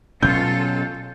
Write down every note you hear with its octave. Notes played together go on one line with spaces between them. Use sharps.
B2 F#3 C#4 F4 A4 G6